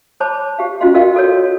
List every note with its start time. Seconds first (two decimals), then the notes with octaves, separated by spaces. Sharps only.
0.20 C5 C#5 A5 B5 D6
0.58 G4 F5
0.81 C#4 F4 F#4 D#5 F5 C6
0.94 F4 F#4 A#4 D#5 F5 G5
1.15 F#4 A4 A#4 C#5